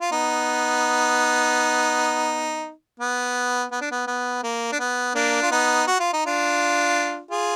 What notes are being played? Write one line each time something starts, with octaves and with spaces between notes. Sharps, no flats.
F4
B3 D#4
B3
B3
D4
B3
B3
A#3
D4
B3
A#3 D4
F4
B3 D#4
F#4
F4
D#4
D4 F4
F4 G#4